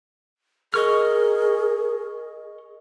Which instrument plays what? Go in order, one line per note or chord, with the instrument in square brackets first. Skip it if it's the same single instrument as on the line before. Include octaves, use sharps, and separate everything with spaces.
[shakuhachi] G#4 [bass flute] A#4 [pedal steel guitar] D#5 C#6 F6